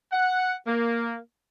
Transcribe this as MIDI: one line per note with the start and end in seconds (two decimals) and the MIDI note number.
0.12 0.53 78
0.66 1.16 58